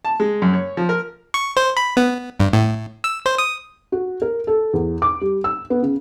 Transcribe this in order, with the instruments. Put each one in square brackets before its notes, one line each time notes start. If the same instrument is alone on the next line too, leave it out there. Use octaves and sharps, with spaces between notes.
[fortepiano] A5
G#3
F#2
C#5
F3
A#4
[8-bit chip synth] C#6
C5
B5
B3
G2
A2
E6
C5
D#6
[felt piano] F#4
A#4
A4
E2
D6
G3
E6
B3
C#3